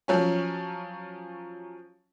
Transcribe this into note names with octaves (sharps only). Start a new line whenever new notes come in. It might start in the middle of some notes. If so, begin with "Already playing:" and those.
F3 F#3 C#4